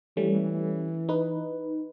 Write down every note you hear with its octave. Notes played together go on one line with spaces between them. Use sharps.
E3 G3 A3 C#4
D#4 B4